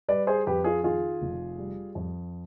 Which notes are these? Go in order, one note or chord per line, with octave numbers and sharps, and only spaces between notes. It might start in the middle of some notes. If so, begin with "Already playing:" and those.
G3 B4 D5
G#4 C5
F2 G4 B4
F4 G#4
D#3 F4 G#4
F1
G3
F2